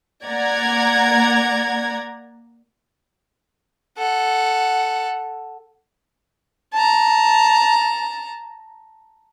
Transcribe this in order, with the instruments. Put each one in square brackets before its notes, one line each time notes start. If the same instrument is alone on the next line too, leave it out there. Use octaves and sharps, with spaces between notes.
[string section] A#3 D5 F#5 A#5 G#6
[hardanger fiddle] A4 F#5
A5 A#5